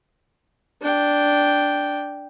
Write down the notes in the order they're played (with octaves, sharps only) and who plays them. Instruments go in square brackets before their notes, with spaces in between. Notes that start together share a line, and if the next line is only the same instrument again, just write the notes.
[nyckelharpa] D4 G5